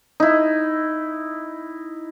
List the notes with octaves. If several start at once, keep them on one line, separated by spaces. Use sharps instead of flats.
D#4 E4